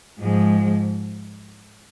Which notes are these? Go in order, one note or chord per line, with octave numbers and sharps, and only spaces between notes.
G#2 F3 G#3